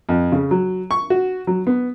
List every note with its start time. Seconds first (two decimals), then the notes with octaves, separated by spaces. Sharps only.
0.09 F2
0.32 C#3
0.51 F#3
0.91 C#6
1.10 F#4
1.47 F#3
1.67 B3